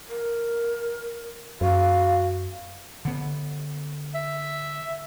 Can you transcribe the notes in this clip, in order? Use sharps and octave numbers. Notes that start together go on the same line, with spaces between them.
A#4
F#2 F#4 F5
D3 B3
E5